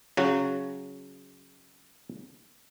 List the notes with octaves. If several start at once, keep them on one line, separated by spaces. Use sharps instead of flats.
C#3 F#3 F#4